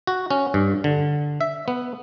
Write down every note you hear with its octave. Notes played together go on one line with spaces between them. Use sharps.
F#4
C#4
G2
D3
E5
B3